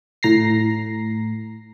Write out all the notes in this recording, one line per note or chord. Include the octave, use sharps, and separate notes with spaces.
A2 A#5 A#6 C7